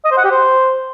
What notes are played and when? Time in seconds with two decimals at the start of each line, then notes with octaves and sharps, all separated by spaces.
0.05 D#5
0.11 C5
0.18 F#5
0.24 G4
0.31 C5